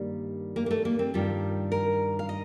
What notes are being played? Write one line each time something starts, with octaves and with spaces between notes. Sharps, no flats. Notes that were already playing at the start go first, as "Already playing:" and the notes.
Already playing: G2 D#3 G3 A#3
A#3
A#3
A3
A#3
C4
G2 D#3 G3 F4
A#4
F5
D#5